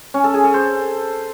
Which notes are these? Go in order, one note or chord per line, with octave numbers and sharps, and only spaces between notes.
C#4
A4
G#4
A4
C5